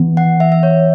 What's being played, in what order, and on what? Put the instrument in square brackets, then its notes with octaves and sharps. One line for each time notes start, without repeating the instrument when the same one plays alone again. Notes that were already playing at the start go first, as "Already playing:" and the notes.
Already playing: [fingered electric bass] E3 B3
[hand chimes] F#5
E5
E5
C#5